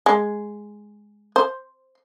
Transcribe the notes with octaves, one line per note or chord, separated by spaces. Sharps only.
G#3
C5